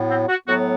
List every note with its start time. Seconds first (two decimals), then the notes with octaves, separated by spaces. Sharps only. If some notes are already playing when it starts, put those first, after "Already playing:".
Already playing: A2 F#3 B3
0.09 C4
0.28 F#4
0.47 A2 F#3 B3 F#4